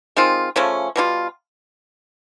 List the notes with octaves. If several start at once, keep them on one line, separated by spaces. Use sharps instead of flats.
D#3 G#3 C4 F4
C#3 F3 A3 C#4
B2 G3 C4 F4